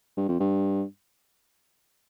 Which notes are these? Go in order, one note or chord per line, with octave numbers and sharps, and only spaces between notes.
G2
F2
G2